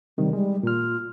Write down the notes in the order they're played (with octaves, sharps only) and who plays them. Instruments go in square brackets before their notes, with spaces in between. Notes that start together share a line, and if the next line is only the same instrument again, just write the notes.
[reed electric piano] C3 D#3 [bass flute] G3
[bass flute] G3 [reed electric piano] G#3
[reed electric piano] A#2 F6 [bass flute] F4